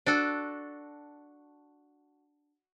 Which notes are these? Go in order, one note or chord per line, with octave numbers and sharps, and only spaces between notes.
D4 F#4 A4